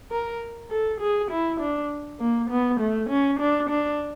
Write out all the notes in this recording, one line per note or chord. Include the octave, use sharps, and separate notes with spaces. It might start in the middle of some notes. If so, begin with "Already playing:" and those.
A#4
A4
G#4
E4
D4
A#3
B3
A3
C#4
D4
D4